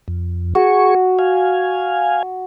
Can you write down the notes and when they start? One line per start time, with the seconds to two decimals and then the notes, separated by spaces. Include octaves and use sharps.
0.08 F2
0.55 F#4 G#4 C#6
1.19 F5 G#5